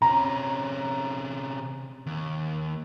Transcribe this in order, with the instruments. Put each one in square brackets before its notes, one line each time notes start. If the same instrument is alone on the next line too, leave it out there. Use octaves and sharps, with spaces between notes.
[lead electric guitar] C3 C#4 [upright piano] A#5
[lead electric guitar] D#2